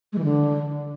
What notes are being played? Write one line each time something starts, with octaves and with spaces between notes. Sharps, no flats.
G#3
E3
D3